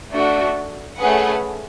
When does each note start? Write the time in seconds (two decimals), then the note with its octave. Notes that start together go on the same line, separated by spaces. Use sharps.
0.12 A3 D4 F#4
0.98 A3 C#4 G#4 B4 F#5